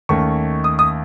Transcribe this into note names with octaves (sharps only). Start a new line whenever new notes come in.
D#2 D#3 A3 C#4 C#6
D#6
D#6